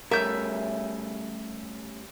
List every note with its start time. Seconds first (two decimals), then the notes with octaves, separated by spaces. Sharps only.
0.11 G3 A3 C#4 A#4 E5 G6